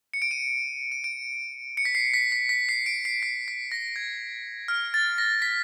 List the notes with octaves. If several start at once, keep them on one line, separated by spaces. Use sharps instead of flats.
C#7
D7
D#7
D#7
D7
C#7
B6
C7
B6
B6
B6
C7
D7
C7
B6
B6
A#6
G#6
F6
A6
A#6
B6